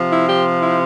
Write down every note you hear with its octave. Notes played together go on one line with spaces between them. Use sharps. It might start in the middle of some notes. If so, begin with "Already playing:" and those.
Already playing: C3 F3
E4
G4
E4